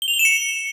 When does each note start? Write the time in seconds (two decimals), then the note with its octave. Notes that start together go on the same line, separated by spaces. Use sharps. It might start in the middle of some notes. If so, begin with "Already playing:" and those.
0.02 G7
0.08 F7
0.14 G7
0.19 E7
0.25 C#7